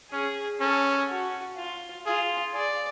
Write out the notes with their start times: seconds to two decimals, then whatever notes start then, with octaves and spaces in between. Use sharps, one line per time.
0.12 C#4 G#4
0.60 C#4 A4
1.09 F#4
1.57 F4
2.06 F4 G#4
2.54 G#4 D5